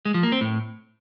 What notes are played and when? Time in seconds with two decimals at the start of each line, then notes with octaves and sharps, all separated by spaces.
0.05 G#3
0.14 F3
0.23 A#3
0.32 C4
0.41 A2